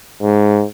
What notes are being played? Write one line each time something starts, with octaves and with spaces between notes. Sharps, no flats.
G#2